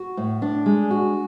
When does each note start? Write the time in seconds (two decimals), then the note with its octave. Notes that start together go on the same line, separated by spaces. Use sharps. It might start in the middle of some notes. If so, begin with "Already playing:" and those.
Already playing: F#4
0.17 A2
0.42 D4
0.66 G#3
0.90 F#4